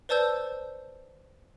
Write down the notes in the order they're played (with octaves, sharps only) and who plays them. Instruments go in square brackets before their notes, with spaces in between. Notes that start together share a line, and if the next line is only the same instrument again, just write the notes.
[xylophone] B4 C5 D5 A5 E6 G6